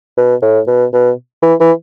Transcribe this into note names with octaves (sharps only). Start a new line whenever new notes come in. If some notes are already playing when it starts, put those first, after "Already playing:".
B2
A2
B2
B2
E3
E3